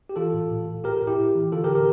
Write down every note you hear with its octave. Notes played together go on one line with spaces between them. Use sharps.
G4
E3 F4 A4
A2
A2
A2
A2 G4 A#4
A2
E4 G4
A2
E3
D3 F4 A4
G4 A#4
G4 A#4